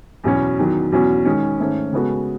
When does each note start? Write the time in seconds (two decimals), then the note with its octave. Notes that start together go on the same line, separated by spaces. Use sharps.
0.24 E2 B2 F#3 C#4
0.59 E2 D#3 F#3
0.92 E2 B2 F#3 C#4 F#4
1.25 D#3 G#3 C#4 G#4
1.60 G#2 D#3 A3 C#4
1.92 C#3 G#3 B3 F#4 A4